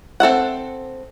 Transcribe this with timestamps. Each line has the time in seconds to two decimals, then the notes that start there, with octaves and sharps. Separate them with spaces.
0.20 C4 A4 E5 F#5